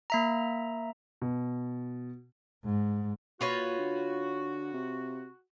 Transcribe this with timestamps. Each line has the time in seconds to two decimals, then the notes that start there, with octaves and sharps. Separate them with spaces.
0.10 A#3 E5 A#5
1.22 B2
2.65 G#2
3.41 A#2 F4 F#4 B4 C#5
3.79 D3
4.74 C3